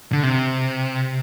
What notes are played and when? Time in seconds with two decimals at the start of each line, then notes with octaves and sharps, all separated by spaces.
0.12 D3
0.23 C3